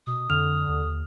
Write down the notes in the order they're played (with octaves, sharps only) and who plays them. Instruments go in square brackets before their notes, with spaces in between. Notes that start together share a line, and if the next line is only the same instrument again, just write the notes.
[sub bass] B2 [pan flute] D#6
[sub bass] F2 [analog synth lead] D3 [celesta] F6 F7
[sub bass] D#2